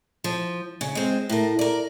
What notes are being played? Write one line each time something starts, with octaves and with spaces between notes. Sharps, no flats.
F3
C#3
G#3 C4
A2 A#4
A#4 D5